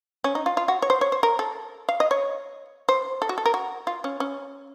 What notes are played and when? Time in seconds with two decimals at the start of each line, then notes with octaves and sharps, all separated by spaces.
0.24 C#4
0.35 D#4
0.46 F4
0.57 F4
0.68 F#4
0.82 C#5
0.90 C5
1.01 C#5
1.12 C5
1.23 A#4
1.39 A4
1.89 F5
2.00 D#5
2.11 C#5
2.89 C5
3.22 A4
3.29 F#4
3.38 A4
3.46 A#4
3.54 F#4
3.87 F4
4.04 C#4
4.20 C#4